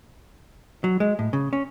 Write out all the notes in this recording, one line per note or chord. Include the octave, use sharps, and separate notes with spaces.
F#3
G#3
A2
C#3
C#4